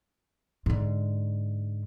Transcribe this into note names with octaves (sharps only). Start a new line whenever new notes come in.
G#2 D3